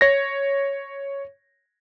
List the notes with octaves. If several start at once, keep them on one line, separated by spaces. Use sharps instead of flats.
C#5 A#6